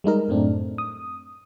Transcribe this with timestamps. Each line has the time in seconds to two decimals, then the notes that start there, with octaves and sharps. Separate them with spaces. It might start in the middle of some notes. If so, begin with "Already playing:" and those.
0.04 G3 G#3 D#4 A#4
0.28 F#2 A2 A3 C4 D4
0.78 D#6